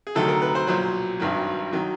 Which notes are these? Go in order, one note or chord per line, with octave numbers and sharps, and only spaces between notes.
G#4
D2 C3 D#3 F#3 A4
A#4
B4
C5
B1 A#2 F#3 C5
G#1 G2 D#3 F#3
D#3 F#3